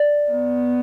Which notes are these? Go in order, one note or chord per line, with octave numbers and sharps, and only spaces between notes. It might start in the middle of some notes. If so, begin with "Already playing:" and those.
Already playing: D5
B3